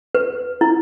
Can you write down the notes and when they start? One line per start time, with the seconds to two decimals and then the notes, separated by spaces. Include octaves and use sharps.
0.15 B4
0.61 E4